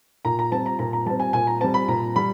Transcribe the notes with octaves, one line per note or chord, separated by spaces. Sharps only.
A#2 A#5
A#5
G3 C4 A5
A#5
A#2 A#5
A#5
G3 C4 A5
G#5
A#2 G#5
A#5
G3 C4 A5
B5
A#2 A#5
G3 B5